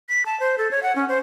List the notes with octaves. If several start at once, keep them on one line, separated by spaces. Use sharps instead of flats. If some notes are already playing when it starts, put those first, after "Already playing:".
B6
A5
C5
A4
C#5
F#5
C#4
C5